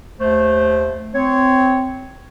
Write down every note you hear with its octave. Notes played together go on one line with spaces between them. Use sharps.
D#2 A3 C5
C4 C#5